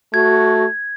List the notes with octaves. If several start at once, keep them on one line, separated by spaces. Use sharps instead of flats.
A3 F#4 G#6